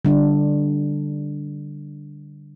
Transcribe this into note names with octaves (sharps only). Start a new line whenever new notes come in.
D3 G3 D4